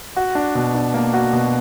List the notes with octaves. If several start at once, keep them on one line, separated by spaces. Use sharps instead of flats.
F#4
D4
B2
D4
A#3
F#4
B2